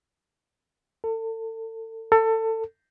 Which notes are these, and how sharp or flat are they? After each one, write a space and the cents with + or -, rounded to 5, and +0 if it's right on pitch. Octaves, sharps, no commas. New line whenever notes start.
A4 +35
A4 +25